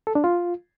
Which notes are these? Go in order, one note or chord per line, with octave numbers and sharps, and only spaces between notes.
A4
D4
F4